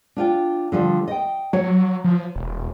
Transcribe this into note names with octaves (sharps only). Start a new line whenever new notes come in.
D4 F4 G5
D3 F3 G3
D#5 G5
F#3 C#5
F3
E1